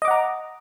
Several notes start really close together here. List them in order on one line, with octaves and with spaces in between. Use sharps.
D#5 D6 F#5 A#5